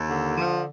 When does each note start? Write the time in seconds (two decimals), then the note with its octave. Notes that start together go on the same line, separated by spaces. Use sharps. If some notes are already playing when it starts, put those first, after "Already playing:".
Already playing: D#2
0.09 D3
0.37 F3